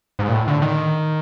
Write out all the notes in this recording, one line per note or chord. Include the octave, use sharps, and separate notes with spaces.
G#2
A#2
A2
D3
D#3